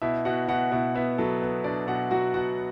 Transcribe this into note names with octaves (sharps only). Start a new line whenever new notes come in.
B2 E4 E5
B2 F#4 F#5
B2 F#4 F#5
B2 E4 E5
B3 E4 E5
F#3 A4
B3
B2 D4 D5
B2 F#4 F#5
F#3 F#4 F#5
B2 F#4 F#5